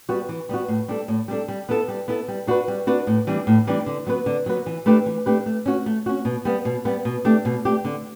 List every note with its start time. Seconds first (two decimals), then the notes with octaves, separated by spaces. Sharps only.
0.09 G3 B3 F#4
0.29 E3
0.49 G3 B3 F#4
0.68 A2
0.88 G3 D4 A4
1.08 A2
1.28 G3 D4 A4
1.48 G3
1.69 B3 E4 A4
1.88 G3
2.08 B3 E4 A4
2.28 G3
2.47 D4 F#4 B4
2.68 G3
2.87 D4 F#4 B4
3.07 A2
3.27 E3 G3 D4
3.47 A2
3.67 E3 G3 D4
3.86 D3
4.07 F#3 B3 F#4 B4
4.26 D3
4.46 F#3 B3 F#4 B4
4.66 E3
4.86 A3 D4 G4 B4
5.06 E3
5.26 A3 D4 G4 B4
5.46 A3
5.66 C#4 F#4
5.86 A3
6.06 C#4 F#4
6.25 B2
6.45 G3 B3
6.65 B2
6.85 G3 B3
7.05 B2
7.25 A3 D4 G4
7.45 B2
7.65 A3 D4 G4
7.85 D3